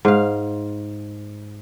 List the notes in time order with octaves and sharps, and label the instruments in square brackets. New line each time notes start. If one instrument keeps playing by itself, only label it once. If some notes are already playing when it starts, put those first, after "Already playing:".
[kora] G#2 F5